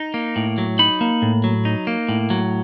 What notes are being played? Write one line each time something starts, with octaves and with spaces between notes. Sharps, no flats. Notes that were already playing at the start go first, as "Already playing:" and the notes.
Already playing: D#4
A#3
A2
F#3
D#4 B5
A#3
A2
F#3
D#4
A#3
A2
F#3